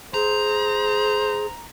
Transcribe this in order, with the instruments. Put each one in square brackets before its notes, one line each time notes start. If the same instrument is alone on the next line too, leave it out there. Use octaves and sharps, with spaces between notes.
[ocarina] G#4 [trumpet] C5 [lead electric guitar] A#5